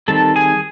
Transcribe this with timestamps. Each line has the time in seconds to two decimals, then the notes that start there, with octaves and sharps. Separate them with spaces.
0.08 D#3 G3 C4 A4 A5
0.36 G#4 G#5